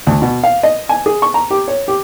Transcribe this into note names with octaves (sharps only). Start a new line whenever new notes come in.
D2
B2
F5
D#5
G#5
G#4
C#6
A#5
G4
C#5
G4